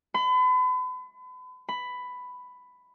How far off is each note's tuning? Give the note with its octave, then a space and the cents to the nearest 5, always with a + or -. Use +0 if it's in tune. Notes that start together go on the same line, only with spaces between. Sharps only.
B5 +40
B5 +10